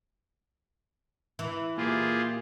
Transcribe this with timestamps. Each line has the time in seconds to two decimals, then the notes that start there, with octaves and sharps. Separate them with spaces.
1.39 E3
1.77 A#2 A#3 F4 G4 G#4